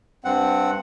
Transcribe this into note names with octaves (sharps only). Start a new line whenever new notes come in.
G2 C4 F#5